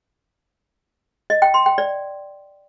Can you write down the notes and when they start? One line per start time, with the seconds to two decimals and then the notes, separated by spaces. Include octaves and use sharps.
1.30 D#5
1.42 G5
1.54 C6
1.66 G5
1.78 D5